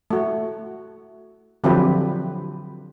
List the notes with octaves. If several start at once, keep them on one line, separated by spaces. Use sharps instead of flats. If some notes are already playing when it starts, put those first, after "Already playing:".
A3 F#4
D3 F3 F#3 C4 G4 B4